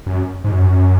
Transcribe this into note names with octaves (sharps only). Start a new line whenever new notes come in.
F#2
G#2
F#2